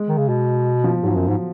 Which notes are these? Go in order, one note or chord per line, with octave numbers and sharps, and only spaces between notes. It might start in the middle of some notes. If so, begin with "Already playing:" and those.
Already playing: G#3
D#3
C#3
B2
F3
G#2 F#3
F#2
G#2